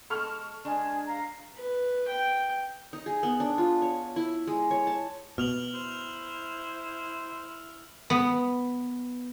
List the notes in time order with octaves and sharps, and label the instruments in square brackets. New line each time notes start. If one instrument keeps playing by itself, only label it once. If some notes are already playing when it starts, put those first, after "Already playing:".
[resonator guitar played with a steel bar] G#3 A4 [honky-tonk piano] C#6 F6 F7
[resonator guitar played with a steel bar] G#3 D4 [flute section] G#4
[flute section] F5 A#5
[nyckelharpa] B4
G5
[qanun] D#4
G#4
B3
D4
F4
C#5
E4
G#3
C#5
A5
[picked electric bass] B2 [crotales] F6 F7 F#7
[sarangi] E4 [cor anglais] C5
[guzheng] B3